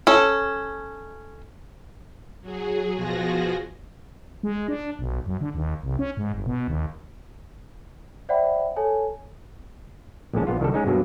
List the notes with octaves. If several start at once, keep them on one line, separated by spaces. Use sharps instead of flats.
C#4 A4
F#3 G#4
B2 F3 F4 F#4 G#4 A#6
G#3
D4
B1
F#2
D3
D#2
C2
C#4
G#2
G1
B2
D#2
C5 D5 E5 F#5 G5 B5
A4 C#5 G#5 A5
A#1 D#2 A2 G#3 C#4 A5
A#1 B3 F4
C2 D#3 G3 A4
G#3 C#4 D#4
G2 B2 F#3 A#3